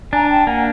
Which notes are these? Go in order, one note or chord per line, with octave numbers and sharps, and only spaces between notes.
D4 G#5 A#5
G5 A5
A#3 F#5 G#5